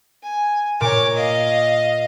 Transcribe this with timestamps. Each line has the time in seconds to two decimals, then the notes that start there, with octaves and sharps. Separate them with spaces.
0.23 G#5
0.81 A#2 A#4 C#5 D6
1.14 D#5 F5